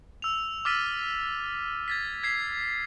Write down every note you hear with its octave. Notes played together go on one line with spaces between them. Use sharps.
E6 F7
D6 E6 F6 A6 B6 D#7
G#6 A6 B6
G#6 B6 C7